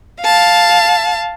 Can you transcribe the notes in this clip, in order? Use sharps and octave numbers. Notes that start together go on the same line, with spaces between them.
F5 A5